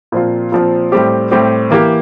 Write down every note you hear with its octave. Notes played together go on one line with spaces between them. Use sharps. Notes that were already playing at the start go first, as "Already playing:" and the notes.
A#2 F3 C4 F4
A#2 F3 C4 F4
A2 G3 C4 G4
A2 G3 C4 G4
E3 A#3 E4 G4